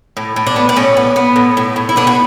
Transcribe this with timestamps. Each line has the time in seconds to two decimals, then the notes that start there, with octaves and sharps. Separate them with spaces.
0.17 A2
0.36 A2
0.47 D4
0.56 B3
0.69 D4
0.76 A2 C#4
0.97 B3
1.16 B3
1.36 A2
1.57 A2
1.76 A2
1.89 E4
1.96 B3 D4
2.07 F#4